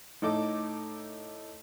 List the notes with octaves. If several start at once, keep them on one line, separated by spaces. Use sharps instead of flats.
A2 D#4 A4 D6